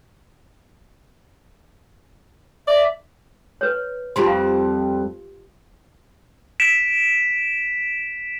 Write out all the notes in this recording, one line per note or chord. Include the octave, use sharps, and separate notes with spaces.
D5 E5
B4 C#5
F2 G3 C4 F4 G4 C6
F5
B6 D7 E7